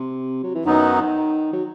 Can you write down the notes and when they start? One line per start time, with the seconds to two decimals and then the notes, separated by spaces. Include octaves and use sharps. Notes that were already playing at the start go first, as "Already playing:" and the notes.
Already playing: C3
0.43 F#3
0.55 E3
0.65 F#2 D#3 F#3 B3 D#4
1.53 F#3